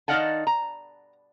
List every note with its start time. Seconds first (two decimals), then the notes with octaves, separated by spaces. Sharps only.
0.08 D#3 D#4 D5 F5 F#5 A5
0.47 A#5